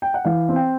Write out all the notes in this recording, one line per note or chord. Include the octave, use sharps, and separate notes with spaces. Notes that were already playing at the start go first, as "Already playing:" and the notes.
G5
F#5
E3 F5
C4
G5